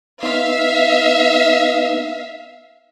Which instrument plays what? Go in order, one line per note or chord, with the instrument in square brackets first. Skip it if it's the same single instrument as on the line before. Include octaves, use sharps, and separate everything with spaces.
[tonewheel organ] B3 D#4 [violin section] E5 F5